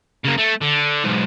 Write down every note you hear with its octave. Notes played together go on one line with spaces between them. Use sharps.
C#3 A#3
A3
D3
B1 G#2